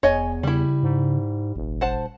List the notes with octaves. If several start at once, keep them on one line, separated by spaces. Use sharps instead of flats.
D#1 E2 C#5 D#5 G#5
C#3 G3 E4
G#2
D#1 G#1
C5 F#5 A5